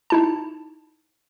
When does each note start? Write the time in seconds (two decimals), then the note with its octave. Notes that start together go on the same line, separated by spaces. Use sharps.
0.10 D#4 E4 A5